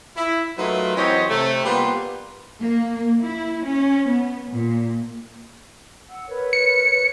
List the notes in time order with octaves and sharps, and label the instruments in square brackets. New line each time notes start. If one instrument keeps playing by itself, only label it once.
[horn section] E4
F#3 A3 D#4 F4 A#4 B4
E3 F#3 C4 G4 C#5 D#5
C3 A3
G3 A#3 B3 F4 B4
[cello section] A#3
E4
C#4
B3
A#2
[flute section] F#5 E6
A#4 B4 C#5
[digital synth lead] C#7